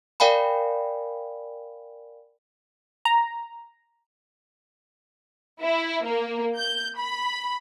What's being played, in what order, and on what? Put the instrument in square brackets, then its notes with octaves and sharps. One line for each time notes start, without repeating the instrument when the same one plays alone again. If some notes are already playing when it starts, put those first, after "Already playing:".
[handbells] A#4 D5 F5 G5 G#5 B5
[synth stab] A#5
[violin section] E4
A#3
G6
B5